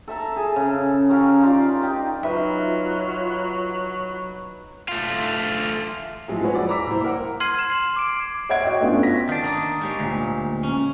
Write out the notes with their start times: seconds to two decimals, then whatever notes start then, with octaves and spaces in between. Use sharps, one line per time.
0.08 A4 E5 A5 A#5
0.36 G#4
0.56 C#3 A4
1.09 C#4 G4 A#4 F5
1.42 D#4 F4 D5
1.81 D#4 G4 D#5
2.23 F#3 D#4 F4 B4 E5
4.89 A3 F4
6.28 A#2 F3 F#3 G#3 A3 E4
6.40 F3 G#3 E4 F#4 B4 C#5
6.53 F2 D5 F#5
6.69 A#5 B5 D6 E6 B6
6.87 C2 A#3 E4 C5
7.04 A#4 F#5
7.40 C6 F6 G#6 C7 D#7
7.54 G#6 E7
7.70 C7 F#7
7.96 D6 D7
8.49 C#5 E5 F#5 G#6 D7
8.64 F#4 D#5 G5
8.81 A3 B3 C#4 D4 F4
9.03 A#6 B6
9.29 D#3 D4
9.44 A#3 D#4
9.81 G#3 G4 C#5
10.00 D2 A#2
10.63 C#4